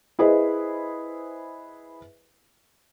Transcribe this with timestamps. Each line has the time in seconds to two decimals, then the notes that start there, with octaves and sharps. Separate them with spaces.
0.19 E4 G#4 B4 C5 D#5